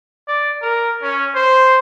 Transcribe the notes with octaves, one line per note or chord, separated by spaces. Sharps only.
D5
A#4
C#4
C5